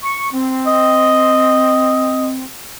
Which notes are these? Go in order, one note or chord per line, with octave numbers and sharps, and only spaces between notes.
C#6
C4
D#5